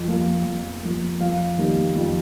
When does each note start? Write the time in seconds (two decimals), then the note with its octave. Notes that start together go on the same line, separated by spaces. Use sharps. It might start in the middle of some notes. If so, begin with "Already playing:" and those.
Already playing: F2
0.08 F3 A#3
0.45 F2
0.83 F3 A#3
1.21 F2 F5
1.58 D#3 G3 A#3
1.96 F2